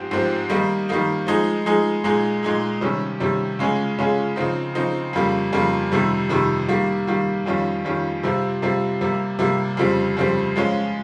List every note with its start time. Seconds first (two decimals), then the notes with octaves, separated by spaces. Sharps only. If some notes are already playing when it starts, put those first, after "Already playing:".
Already playing: G#2 F3 C4 G4
0.11 G#2 F3 C4 G4
0.49 D#3 G3 A#3 D#4
0.89 D#3 G3 A#3 D#4
1.27 F3 G#3 D#4 G#4
1.66 F3 G#3 D#4 G#4
2.04 A#2 G#3 D#4 G#4
2.43 A#2 G#3 D#4 G#4
2.81 C3 D#3 G3 C#4
3.20 C3 D#3 G3 C#4
3.59 C#3 G#3 C#4 F4 G#4
3.98 C#3 G#3 C#4 F4 G#4
4.36 C#3 F3 C4 D#4
4.75 C#3 F3 C4 D#4
5.13 F2 C#3 G3 A#3
5.53 F2 C#3 G3 A#3
5.92 F2 C3 D#3 G3
6.29 F2 C3 D#3 G3
6.68 D#3 G3 A#3
7.07 D#3 G3 A#3
7.46 F2 D#3 G3 C#4 F4
7.85 F2 D#3 G3 C#4 F4
8.23 C3 G3 C4 F4
8.62 C3 G3 C4 F4
9.01 C3 G3 A#3
9.39 C3 G3 A#3
9.77 F2 C#3 G3 C4
10.17 F2 C#3 G3 C4
10.56 F3 G#3 C#4 F4